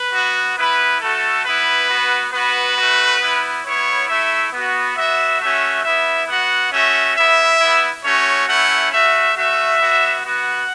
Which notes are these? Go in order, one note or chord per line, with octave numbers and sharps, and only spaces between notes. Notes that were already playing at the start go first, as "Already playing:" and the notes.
Already playing: B4
B3 F#4
B3 E4 B4
A3 F#4 A4
B3 E4 B4
B3 F#4
B3 F#4 B4
A3 F#4
B3 E4
B3 E4 C#5
A3 E4 E5
B3 F#4
B3 F#4 E5
A3 C#4 F#4 E5
B3 E4 E5
B3 F#4 F#5
A3 C#4 F#4 E5
B3 E4 E5
B3 E4
A3 C#4 F#4 C#5
A3 C#4 E4 F#5
A3 F#4 E5
A3 F#4 E5
B3 F#4
B3 F#4 F#5